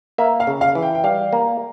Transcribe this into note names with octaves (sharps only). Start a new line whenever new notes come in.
A#3 E5
F5
C#3
F5
E3
G5
G5
G3 F5
A#3